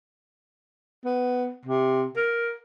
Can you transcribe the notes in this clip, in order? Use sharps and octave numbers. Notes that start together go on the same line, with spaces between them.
B3
C3
A#4